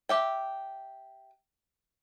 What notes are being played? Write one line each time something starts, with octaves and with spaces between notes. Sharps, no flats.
G4 E5 G5